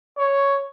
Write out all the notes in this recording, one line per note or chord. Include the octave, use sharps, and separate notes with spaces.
C#5